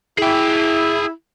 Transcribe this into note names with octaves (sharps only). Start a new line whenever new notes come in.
E4 G#4 G5